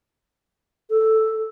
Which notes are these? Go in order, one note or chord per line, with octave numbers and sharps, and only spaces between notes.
A4